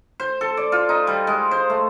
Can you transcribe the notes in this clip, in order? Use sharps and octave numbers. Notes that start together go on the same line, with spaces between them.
C5
A4
D5
F4
D#4
G3
G#3
C5
A3